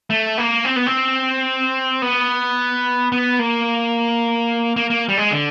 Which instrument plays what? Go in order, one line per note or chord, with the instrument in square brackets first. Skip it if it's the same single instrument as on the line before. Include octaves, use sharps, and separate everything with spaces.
[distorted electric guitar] A3
A#3
C4
B3
C4
B3
B3
A#3
A#3
A#3
G3
G#3
D3